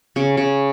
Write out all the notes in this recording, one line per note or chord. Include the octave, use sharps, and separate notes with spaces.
C#3
C#3